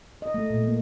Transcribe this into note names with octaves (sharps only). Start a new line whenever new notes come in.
D#5
A3
A#2
A#3